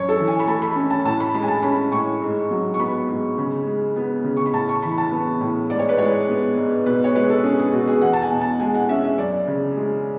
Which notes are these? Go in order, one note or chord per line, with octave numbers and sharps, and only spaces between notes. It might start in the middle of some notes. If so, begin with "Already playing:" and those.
Already playing: F#2 C#5
A4
E3
G#5
B5
A3 A5
B5
C#4
A5
A2 A5
B5
G#3 B5
G#5
A5
C#4 B5
A2 C#6
G#2
F#3
C#6
B3 B5
G#2
C#3
G#3
B3
C#3
C#6
B5
A2 A5
C#6
E3 B5
A5
B3
A2
G#2 D5
C#5
B4
G#3 C#5
B3
G#2
B2 B4
C#5
G#3 B4
A4
C#4 G#4
G#4
B2 F#4
G#4
E2 F#5
A5
G#5
B2
A5
G#3 G#5
F#5
C#4 E5
E5
F#2 D5
C#3
G#3